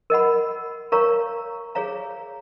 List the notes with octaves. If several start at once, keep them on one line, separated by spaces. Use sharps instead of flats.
A#4 D#5 F#5 B5
A#4 C#5 F5 A#5 C#6
G#4 C#5 F5 A#5